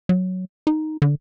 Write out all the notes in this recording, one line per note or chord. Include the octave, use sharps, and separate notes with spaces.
F#3
D#4
D3